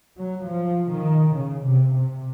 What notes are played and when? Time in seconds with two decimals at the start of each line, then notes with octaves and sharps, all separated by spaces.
0.16 F#3
0.46 F3
0.91 D#3
1.35 C#3
1.65 C3
1.94 C3